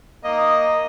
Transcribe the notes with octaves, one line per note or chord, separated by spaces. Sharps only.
A#3 D#4 D#5 D#6